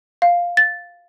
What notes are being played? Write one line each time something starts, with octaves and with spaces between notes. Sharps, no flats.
F5
A6